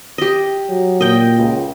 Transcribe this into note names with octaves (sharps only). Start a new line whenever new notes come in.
G4 D#5
F#3
A#2 D#5 G5
C#2